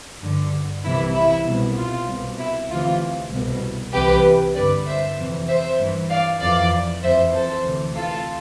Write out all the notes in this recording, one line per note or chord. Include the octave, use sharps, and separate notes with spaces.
G2 D3
C2 C3 E3 E4
E4
C2 B2
F4
C2 B2
E4
D2 C3 E3 F4
C2 B2
C2 C3 E3 G4 B4
G2 D3 B4 D5
C5 E5
F2 C3 E3
C5 E5
G2 E3
D5 F5
F2 E3 D5 F5
F2 E3 C5 E5
A4 C5
D2 C3 E3
F4 A4